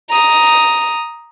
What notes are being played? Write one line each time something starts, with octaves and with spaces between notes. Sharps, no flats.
A#5 D#6